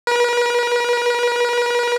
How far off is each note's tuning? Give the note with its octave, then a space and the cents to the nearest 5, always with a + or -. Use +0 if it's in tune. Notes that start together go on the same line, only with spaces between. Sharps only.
B4 -45